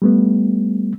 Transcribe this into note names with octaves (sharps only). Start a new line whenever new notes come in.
G3 A3 B3